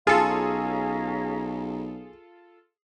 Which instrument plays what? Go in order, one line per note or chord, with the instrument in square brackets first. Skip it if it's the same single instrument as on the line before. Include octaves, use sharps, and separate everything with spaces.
[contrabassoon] B1 [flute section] C#4 F5 A#5 [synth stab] F4 A4 [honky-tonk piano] G#4